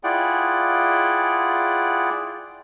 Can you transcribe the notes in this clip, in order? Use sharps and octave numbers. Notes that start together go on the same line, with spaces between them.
E4 F4 G#4 D5 F#5 G5